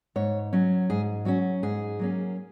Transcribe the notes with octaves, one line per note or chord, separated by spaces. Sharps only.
G#2 C#5
F#3 C#4
G#2 G#4
F#3 C#4 F#4
G#2 G#4
F#3 A#3 C#4